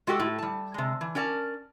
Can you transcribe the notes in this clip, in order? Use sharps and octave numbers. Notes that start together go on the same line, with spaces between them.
G#3 F#4 G4 A4
A2
G3 A5
C3 G#3
E3
C#4 A#4 D5 G5 A5